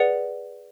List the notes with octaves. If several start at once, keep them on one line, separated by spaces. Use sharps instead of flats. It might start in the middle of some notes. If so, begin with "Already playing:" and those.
Already playing: G#4 B4 D5 F#5 C#7